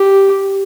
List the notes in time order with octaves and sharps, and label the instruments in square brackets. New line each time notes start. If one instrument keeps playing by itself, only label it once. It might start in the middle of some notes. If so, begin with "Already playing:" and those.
Already playing: [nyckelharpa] G4